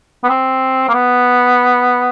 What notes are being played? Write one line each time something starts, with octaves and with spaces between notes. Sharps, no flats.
B3
C4
A#3
B3